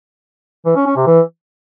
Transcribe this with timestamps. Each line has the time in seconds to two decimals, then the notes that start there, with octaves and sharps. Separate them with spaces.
0.66 E3
0.76 C#4
0.86 C#4
0.96 C3
1.07 E3